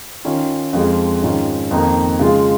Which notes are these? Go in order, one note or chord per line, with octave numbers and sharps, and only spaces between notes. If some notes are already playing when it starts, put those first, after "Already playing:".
D#3 C#4 F4
F2 F3 G#3 F4
G#2 D#3 C#4 F4
F2 D#3 A#3 D#4
C#3 G#3 F4